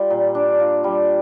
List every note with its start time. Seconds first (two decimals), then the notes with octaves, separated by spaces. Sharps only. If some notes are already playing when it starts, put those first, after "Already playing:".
Already playing: G3 F4
0.10 A#2
0.35 D4
0.60 F4
0.84 G3